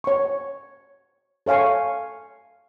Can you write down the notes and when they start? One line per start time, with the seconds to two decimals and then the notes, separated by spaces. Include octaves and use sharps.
0.04 C#5 C#6
1.46 A4 C#5 F5 G#5 C#6